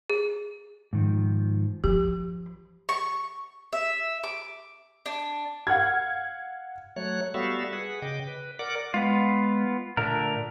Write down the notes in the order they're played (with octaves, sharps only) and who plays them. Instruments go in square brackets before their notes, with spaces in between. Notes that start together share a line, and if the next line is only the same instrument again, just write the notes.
[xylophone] G#4
[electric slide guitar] G#2 D#3 F3
[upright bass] F3 [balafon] G4
[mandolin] C#6
E5
D6
D4
[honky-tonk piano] F5 F#5 F6 G#6
[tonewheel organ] F#3 A3 C#5 F#6
G3 B3 F#4 A4 E5 F5
G#4 B4 F#5
C#3 D#5 G5 D6
B4
A#4 D5 F#5 D6
[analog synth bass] G#3 [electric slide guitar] B3 F4
[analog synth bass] A#2 [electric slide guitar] D3 A3 A#4